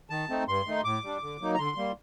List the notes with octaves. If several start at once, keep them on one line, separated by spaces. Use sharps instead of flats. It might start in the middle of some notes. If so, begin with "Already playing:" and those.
D#3 A5
A3 C4 D#4
G2 C6
D#3 A3 D#4
A2 D6
G3 D4
D3
F#3 A#3 D#4
A#5
D3 C6
G3 A#3